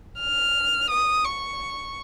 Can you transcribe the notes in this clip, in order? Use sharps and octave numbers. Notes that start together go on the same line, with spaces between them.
F6
D#6
C#6